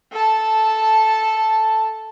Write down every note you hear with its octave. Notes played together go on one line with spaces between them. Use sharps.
A4 A5